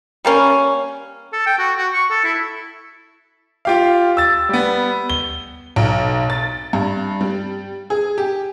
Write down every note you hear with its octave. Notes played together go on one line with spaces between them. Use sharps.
G3 A#3 C#4
A4
G5
F#4
F#4
C#6
A4
E4
F4 G4 F5
E6 A6
G3 B3
G7
B1
A6
G2
G3
G#4
G4